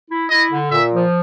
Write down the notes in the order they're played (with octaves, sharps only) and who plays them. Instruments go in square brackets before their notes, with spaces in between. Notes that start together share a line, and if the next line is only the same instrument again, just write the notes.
[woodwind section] E4
[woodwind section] E4 [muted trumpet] D#5
[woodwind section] D3
[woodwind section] A#2 [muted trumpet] E5
[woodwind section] F3